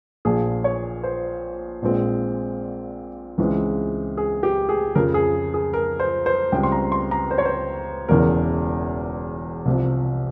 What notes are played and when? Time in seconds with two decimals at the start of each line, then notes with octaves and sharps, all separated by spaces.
0.25 A#1 A#2 F3 G#4
0.64 C#5
1.04 C5
1.82 A#1 A#2 G#3 C4
3.38 C#2 C#3 E3 G#3 C4
4.17 G#4
4.43 G4
4.69 G#4
4.95 F2 C#3 F3 A#4
5.14 G#4
5.54 G#4
5.73 A#4
6.00 C5
6.26 C5
6.52 C#2 C#3 G3 C4 G5
6.63 C6
6.72 A#5
6.92 C6
7.11 A#5
7.31 C5
7.38 C#5
7.46 C5
8.08 E1 E2 C#3 E3 A#4
9.66 C2 C3 F3 C4